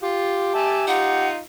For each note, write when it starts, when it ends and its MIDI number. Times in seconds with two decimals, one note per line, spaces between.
0.03 0.53 65
0.03 1.30 67
0.55 0.86 76
0.55 0.86 80
0.55 0.86 81
0.87 1.39 63
0.87 1.39 65
0.87 1.29 78